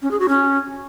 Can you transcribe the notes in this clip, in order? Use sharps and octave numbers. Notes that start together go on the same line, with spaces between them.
C#4
G#4
F#4
C#4